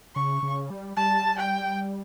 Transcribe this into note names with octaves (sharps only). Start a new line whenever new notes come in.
C#3 C#6
C#3
G3
G3 A5
G5